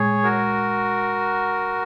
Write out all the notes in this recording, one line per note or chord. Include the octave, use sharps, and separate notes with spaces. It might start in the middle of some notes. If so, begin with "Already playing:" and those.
Already playing: A#2 G#3 G#4 C#5
F#4 A#4